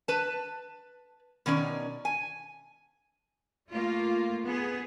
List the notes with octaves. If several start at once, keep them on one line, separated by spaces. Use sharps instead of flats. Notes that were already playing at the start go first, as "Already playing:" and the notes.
B4 A5
B2 D#3 C#4 D5
G#5
A3 A#3 F4
B3 G#4